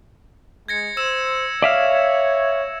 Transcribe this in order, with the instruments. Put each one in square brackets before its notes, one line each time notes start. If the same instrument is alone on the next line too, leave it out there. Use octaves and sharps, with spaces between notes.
[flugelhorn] G#3 [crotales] G#6 A#6 C#7
[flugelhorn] C5 [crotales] E6 E7
[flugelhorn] C#5 [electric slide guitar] D5 E5 F5